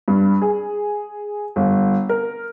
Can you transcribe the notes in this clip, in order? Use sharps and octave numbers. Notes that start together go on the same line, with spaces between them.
G2
G#4
G1
A#4